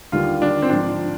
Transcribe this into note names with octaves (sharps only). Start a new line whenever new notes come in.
D#2 D3 G3 F4
D4
C4
G#2 F3 D4